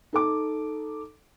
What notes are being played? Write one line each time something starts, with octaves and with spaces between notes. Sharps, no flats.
D#4 A4 D6